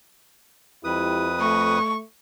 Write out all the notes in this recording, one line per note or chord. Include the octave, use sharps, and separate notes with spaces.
F2 G#3 E4 G4 B4 D#6
A3 C#6